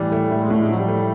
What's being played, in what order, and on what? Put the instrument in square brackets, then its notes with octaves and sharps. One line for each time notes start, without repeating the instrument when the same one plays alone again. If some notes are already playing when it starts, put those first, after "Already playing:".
Already playing: [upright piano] A2 E3 [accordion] G3
[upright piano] A3
A2
[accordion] G#3
[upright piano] A2 [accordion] A3
[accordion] G#3
[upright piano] F3 [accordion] F#3
[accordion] G3
[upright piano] A3